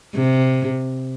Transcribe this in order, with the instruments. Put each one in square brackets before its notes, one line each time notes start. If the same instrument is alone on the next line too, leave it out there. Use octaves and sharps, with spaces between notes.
[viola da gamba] C3